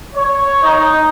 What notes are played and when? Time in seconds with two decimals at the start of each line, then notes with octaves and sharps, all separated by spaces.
0.14 C#5
0.63 D#4